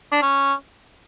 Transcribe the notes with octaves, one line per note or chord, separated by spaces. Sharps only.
D4
C#4